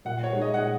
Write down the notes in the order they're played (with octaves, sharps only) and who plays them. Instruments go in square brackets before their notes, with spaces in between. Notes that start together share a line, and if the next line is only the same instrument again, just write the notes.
[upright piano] A#2 [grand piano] F#5
[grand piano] C#5
[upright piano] G#3 D#4
[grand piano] D#5
F#5
[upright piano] A#2